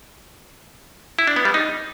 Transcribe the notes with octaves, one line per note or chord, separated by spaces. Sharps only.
E4
D4
B3
G3
D#4